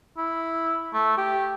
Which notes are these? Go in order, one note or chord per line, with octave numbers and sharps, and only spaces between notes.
E4
A3
G4